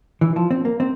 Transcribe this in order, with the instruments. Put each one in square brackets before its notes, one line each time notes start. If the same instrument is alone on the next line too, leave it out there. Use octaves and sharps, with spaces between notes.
[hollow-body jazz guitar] E3
F3
C4
A#3
C4